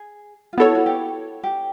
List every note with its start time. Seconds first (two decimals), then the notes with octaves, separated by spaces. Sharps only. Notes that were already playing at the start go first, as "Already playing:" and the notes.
Already playing: G#4
0.53 F4
0.58 B3 E4 F#4 A4 C#5
0.75 F#4
0.86 G4
1.43 G4